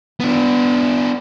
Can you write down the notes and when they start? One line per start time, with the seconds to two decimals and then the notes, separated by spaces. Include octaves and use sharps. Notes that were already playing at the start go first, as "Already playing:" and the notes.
0.20 B3 D4